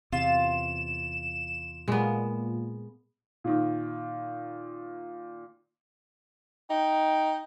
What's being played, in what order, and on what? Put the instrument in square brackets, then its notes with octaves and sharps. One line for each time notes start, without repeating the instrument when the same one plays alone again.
[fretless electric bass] E2 C3 [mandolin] F4 [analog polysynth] E7
[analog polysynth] A#2 [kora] G#3 B3
[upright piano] A#2 D#3
[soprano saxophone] D#4 [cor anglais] G5